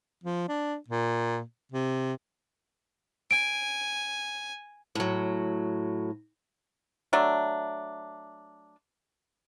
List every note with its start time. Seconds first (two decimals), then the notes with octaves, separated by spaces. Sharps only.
0.24 F3
0.49 D4
0.89 A#2
1.72 C3
3.31 G#5 D7
4.95 A2 F#3
7.13 F#3 A3 D4